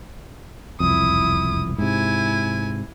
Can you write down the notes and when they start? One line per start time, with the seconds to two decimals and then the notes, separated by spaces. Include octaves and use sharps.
0.80 E1 C2 F2 E4 D#6
1.78 G#2 C3 E4 G#5